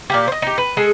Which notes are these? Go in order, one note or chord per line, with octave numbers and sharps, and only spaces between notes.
A#2 A#3 G4
C5 D#5
D#4 G4
B4
G#3 G#4 A4